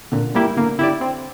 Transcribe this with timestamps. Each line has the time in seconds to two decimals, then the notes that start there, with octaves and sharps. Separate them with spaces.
0.12 A#2 D3
0.35 E3 G3 A#3 E4 G4
0.56 D3 A#3
0.79 D3 E4 G4 D5
1.01 C4